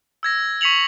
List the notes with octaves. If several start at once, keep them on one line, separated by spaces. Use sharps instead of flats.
E6 G#6 A#6
C#6 B6 C#7 F7 F#7